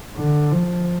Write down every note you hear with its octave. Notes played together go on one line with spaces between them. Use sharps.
D3
F3